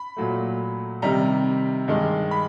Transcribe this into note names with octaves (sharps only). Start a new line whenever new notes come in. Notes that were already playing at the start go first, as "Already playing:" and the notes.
Already playing: B5
A#2 F#3 A3
C3 D#3 G3 A#5
G2 D#3 G#3
B5